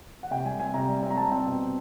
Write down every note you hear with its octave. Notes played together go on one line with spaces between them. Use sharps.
F#5
C3 G5
G3 G#5
C4 G#5
C3 A#5
G3
C4
A#5
G3 A5
C4
B2